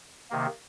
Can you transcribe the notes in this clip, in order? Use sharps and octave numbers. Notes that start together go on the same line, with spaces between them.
C3 D#3 A#3